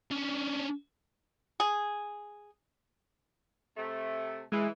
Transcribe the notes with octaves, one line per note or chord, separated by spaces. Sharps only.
C#4 D4
G#4
C3 A3
E3 G#3 G#4